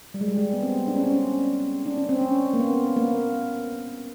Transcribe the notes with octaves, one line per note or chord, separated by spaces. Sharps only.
G3
G#3
G3
G#3
B3
C4
D4
C#4
C4
C#4
D4
C#4
C4
C#4
A#3
B3
A#3